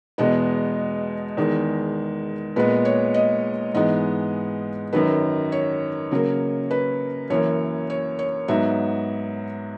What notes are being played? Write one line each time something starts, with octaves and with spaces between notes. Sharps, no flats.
E2 B2 G#3 B3 D#5
E2 D#3 G#3
A#2 G#3 B3 B4
C#5
D#5
G#2 E3 G#3 B3 D#5
F#2 D#3 F#3 B4
C#5
C#3 F#3 A#3
B4
F#2 E3 A#3 C#5
C#5
C#5
G#2 F#3 B3 E5